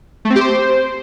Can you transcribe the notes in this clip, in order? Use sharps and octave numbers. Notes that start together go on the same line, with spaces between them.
A3
C4
G4
C5